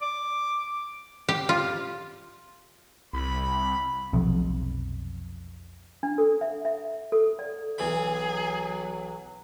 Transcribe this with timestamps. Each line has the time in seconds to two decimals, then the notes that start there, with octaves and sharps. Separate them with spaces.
0.02 D6
1.29 G4
1.49 F4
3.13 C2 B5
4.13 F1 B1 F2
6.03 D4
6.18 A4
6.41 E5
6.65 E5
7.12 A4
7.39 D5
7.78 B1 E3 F#3 G#4 B5